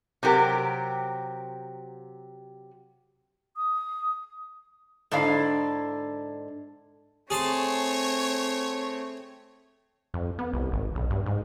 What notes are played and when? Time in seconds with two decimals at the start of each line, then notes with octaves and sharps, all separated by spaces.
0.23 C3 F#3 G4 A#4
3.56 D#6
5.11 G#2 D3 D4 E4 F5
7.30 A3 C4 G#4 C#5 A5 C6
10.14 F2
10.39 B3
10.53 C2
10.72 G#1
10.95 B1
11.10 G2
11.26 G#2